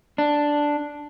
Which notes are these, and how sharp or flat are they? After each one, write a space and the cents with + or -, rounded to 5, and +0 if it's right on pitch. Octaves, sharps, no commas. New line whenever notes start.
D4 +0